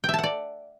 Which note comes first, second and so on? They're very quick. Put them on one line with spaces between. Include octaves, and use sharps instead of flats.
G5 E5 A5 F#5 D5